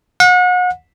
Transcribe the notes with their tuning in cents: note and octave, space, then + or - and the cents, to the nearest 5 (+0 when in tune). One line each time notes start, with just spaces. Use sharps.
F#5 -35